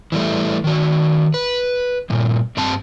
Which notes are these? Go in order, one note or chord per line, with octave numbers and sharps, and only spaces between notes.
E3 G3 A3
D#3 F#4
B4
G2 A#2
G2 G3 C4 G4 A5